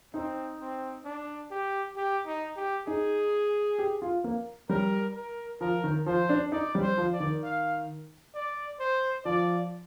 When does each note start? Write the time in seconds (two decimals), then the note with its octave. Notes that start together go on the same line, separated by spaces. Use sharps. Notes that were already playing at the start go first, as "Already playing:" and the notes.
0.14 C4 D#4
0.60 C4
1.05 D4
1.51 G4
1.96 G4
2.26 D#4
2.56 G4
2.87 D#4 G#4
3.79 G4
4.02 F4
4.24 A#3
4.69 G3 A#4
5.15 A#4
5.61 F3 A#4
5.84 D#3
6.06 F3 C5
6.29 D4
6.52 D#4 D5
6.75 G3
6.82 C5
6.98 F3
7.13 D5
7.20 D#3
7.43 F5
8.34 D5
8.80 C5
9.25 F3 D5